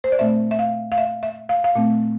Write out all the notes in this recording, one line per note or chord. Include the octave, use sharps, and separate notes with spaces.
C5
D5
A#2 A3 C4 E5
E5
F5
F5
E5
E5
F5
F5
A#2 A3 C4